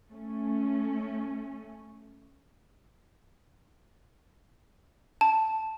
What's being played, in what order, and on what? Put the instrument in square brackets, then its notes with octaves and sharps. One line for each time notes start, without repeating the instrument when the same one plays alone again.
[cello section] A3 C#4
[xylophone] A5